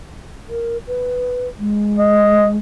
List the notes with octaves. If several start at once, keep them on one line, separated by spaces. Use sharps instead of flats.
A#4
B4
G#3
D#5